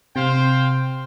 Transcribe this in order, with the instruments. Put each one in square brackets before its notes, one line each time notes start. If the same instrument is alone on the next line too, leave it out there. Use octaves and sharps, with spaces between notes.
[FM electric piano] C3 [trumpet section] C5 F5 G5